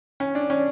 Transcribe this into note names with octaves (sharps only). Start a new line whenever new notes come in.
C#4
D4
C#4